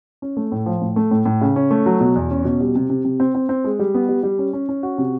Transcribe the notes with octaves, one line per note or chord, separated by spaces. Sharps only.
C#4
A3
A2
F3
A2
A3
A2
A2
C#3
C#4
A3
F#3
B2
E2
C#4
B2
G3
C3
C3
C3
C4
C4
C4
G#3
G3
B3
G3
G3
C#4
C#4
C#4
F#4
C3